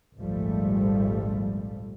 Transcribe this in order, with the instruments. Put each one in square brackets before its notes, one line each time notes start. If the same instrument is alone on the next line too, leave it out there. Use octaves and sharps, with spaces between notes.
[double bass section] G#1 C#2 A#2 F3 G3 A3